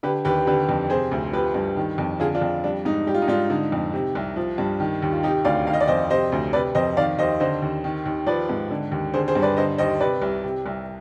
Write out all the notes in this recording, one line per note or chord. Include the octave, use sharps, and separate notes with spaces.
D3 G4 B4
D#2 G4 B4
D3 G4 B4
F2
C3 G#4 C5
D2
F3 G4 B4
G2
D#3
F2
D3 F4 G#4
D4 F4
F2
G3 D4
G#2 D#4
G3 G4
F4
D#4
G#2 D4 F4
D3 D#4
F2
C3
C2
F3
G2
D#3
D#2
F4
C3 D#4 G4
D2 D5 F5
D#3 F5
D#5
D5
F2 C5 D#5
C3 C5 D#5
D2
C3 B4 D5
F2 C5 D#5
D#3 D5 F5
D#2 C5 D#5
D3 C5 D#5
D#2
D#3
D#2
F3 B4 D5
G#2
D3
D#2
D3 G#4 C5
G#4 C5
G2
B4 D5
D3 C5 D#5
D#2 C5 D#5
C3 B4 D5
C2
C3
C2